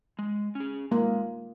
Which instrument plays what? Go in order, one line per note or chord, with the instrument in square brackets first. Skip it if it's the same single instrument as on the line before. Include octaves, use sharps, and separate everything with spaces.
[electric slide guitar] G#3
C#4
G#4
[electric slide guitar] G#3 [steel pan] A#3